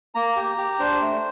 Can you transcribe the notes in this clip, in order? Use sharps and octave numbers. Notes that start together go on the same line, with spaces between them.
A#3 A#5
G4
G4
D4 C5
A3